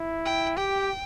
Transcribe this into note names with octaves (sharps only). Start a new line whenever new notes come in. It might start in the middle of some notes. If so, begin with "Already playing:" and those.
Already playing: E4
G5
G4 G5